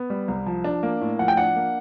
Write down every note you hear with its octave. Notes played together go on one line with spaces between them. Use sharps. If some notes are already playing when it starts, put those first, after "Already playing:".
Already playing: B3
G3
C2
F3
D4
A#3
A2
F3 F#5
G5
D4 F#5
A#3